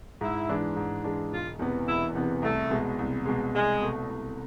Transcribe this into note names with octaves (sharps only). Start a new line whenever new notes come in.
G#2 E4
E3 G#3 D4
G#2
E3 G#3 D4
E1 F4
E2 C3 E3 B3
E1 E4
E2 C3 E3 B3
C2 A3
B2 G#3
C2
B2 G#3
C2 G#3
B2 A3
C2